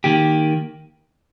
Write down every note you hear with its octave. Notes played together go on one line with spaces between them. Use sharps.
D#3 A#3 G4